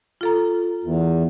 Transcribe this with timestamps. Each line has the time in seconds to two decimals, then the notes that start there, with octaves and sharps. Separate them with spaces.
0.21 F4 A4 A#5
0.84 E2